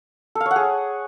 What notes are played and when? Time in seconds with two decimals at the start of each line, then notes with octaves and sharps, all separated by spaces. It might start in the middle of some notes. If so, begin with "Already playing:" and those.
0.35 A4
0.41 F5
0.46 C#5
0.51 F#5
0.56 G#4